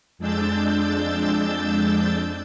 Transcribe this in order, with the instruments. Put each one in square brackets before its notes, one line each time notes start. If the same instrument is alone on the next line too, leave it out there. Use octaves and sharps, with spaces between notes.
[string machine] F2 G#3 D4 E6 G6 A6